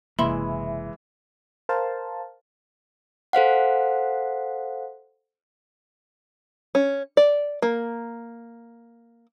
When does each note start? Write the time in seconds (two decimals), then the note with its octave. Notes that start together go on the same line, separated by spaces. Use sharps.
0.19 F#1 C3 E3 G#3 A#3 E4 B5 C6
1.69 A#4 C5 F5 A5
3.33 A4 C5 F5 F#5
6.75 C#4
7.17 D5
7.62 A#3